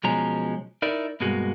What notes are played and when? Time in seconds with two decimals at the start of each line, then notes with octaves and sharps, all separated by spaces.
0.04 B1 B2 F3 G#3 C#4 A#5
0.82 D#4 E4 A#4 D5
1.20 G2 B2 G#3 A#3 F#4